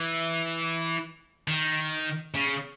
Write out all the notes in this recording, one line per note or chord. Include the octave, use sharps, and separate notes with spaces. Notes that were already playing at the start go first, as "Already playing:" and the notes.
Already playing: E3
D#3
C#3